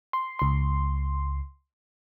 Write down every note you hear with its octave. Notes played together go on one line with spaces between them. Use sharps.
C6
C#2 C6